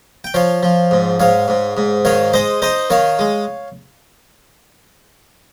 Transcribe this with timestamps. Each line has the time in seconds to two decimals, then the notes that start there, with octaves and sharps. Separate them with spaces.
0.24 G5
0.34 F3 C#5 F5
0.63 F3
0.91 G#2
1.20 G#2 C#5 F5
1.48 G#2
1.77 G#2
2.05 D#3 C#5 F5
2.33 G#3 C5 D#5
2.62 D#4 C5 D#5
2.90 D#3 C#5 F5
3.19 G#3